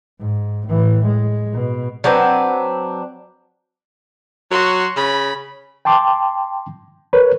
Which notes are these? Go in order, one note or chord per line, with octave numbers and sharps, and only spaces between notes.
G#2
A2 E3
G#3
B2
F#3 C4 D4 B4
F#3 F#4 C6
C#3 B5
G5 A5 C6 D6
A#4 B4 C#5